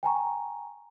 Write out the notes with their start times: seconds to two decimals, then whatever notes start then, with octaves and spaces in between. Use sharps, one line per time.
0.03 G5 G#5 A#5 C#6